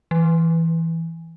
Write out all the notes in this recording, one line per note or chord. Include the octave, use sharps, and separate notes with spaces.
E3